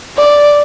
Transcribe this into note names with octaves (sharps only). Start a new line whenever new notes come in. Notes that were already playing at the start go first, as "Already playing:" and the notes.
D5